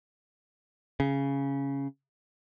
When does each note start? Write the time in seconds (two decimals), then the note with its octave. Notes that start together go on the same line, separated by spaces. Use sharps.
1.00 C#3